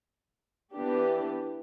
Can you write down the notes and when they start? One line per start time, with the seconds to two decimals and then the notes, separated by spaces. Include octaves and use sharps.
0.72 E3 B3 D4 G4